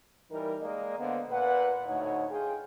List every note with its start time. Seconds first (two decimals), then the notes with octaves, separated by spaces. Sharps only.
0.31 E3 G3 D#4 A#4
0.61 G#3 A#3 D5 D#5
0.98 D3 A#3 B3 C5 F5
1.30 A#2 B4 F#5
1.85 D2 A2 D#4 C#5 D#5 F#5
2.30 F4 G#4 G5